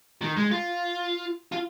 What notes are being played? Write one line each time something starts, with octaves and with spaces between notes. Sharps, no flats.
D#3
G#3
F4
F4